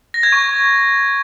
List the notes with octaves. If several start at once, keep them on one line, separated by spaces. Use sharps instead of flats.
A#6
G#6
C#6